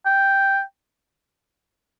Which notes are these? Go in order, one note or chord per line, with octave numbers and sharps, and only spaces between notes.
G5